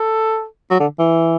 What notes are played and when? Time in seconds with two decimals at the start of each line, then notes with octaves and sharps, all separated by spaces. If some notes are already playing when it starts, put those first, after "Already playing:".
Already playing: A4
0.71 F#3
0.80 D3
0.99 E3